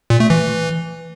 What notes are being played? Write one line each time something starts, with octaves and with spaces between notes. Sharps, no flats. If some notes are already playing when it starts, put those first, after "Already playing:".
A#2
A3
E3